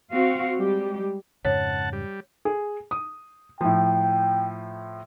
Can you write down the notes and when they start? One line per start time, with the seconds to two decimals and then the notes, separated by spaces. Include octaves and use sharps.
0.12 C4 F#4 F5
0.56 G3 G#3 G4
1.45 F2 G#2 C#3 C#5 F#5 A5
1.93 G3
2.45 G#4
2.91 D#6
3.61 A2 F3 G5